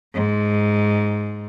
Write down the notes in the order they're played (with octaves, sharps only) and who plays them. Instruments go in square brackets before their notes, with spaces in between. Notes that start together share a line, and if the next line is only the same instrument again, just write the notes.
[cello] G#2